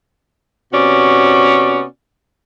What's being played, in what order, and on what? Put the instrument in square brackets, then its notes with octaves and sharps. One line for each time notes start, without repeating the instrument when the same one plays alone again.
[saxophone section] C3 B3 C#4 F#4 D5